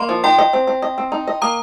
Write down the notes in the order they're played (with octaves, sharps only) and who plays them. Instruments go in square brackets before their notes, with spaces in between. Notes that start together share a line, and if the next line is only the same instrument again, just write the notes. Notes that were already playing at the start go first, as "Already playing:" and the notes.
Already playing: [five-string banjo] A#3 [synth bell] D#5 C6
[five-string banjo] F3
[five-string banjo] D#4 [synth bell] G5 C6
[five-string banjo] D#5
C4
C4
D#5
C4
D#4
D#5
[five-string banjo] A#3 [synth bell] A#5 D#6